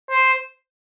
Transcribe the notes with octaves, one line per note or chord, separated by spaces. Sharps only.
C5